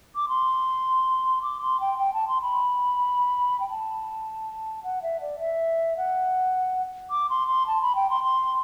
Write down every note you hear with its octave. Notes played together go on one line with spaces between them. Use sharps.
D6
C6
D6
C6
G5
G5
A5
C6
B5
G5
A5
F#5
E5
D5
E5
F#5
D6
C6
C6
A5
B5
G5
C6
C6